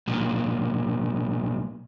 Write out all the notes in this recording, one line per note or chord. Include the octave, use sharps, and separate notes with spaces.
B1 A#2